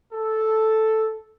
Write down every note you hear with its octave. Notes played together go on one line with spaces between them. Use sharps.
A4